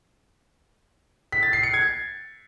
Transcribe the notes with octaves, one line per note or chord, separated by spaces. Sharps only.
B6
A6
C7
C#7
G#6